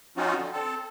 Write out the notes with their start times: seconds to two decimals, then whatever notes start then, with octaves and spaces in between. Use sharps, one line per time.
0.17 F3 C4 C#4 D#4 F4 F#4
0.37 D3
0.53 C4 A4